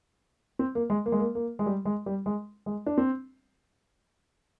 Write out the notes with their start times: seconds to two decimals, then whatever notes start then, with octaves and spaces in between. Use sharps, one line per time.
0.59 C4
0.75 A#3
0.90 G#3
1.06 A#3
1.12 G#3
1.20 A#3
1.35 A#3
1.59 G#3
1.66 G3
1.85 G#3
2.06 G3
2.26 G#3
2.66 G#3
2.86 D4
2.98 C4